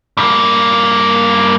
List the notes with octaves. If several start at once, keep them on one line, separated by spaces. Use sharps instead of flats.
G2 A#3